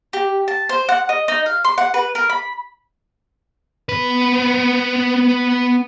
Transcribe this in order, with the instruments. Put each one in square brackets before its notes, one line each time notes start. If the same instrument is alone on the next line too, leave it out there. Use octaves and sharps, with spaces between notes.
[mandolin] G4
A5
C5
F#5
D#5
D#4
F5
C6
F#5
B4
A#4
B5
[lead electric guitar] B3 B4